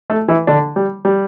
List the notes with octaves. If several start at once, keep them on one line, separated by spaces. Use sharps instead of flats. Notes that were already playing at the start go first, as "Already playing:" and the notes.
A3 A4
E3 E4
D3 D4
G3
G3